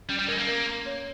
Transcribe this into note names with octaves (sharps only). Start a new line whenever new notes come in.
G3 C#4
G3
G#3 A#4
A#3
A#4
C6
C#5